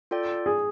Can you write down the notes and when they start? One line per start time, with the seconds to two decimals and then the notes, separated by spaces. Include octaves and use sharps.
0.11 F4 A4 D5 G5
0.46 G#4